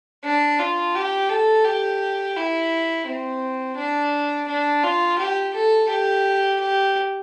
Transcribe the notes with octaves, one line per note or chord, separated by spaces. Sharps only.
D4
F4
G4
A4
G4
E4
C4
D4
D4
F4
G4
A4
G4
G4